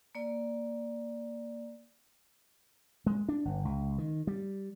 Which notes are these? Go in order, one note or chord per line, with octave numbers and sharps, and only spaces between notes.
A#3 D5
G#3
D4
G1
C#2
D#3
G3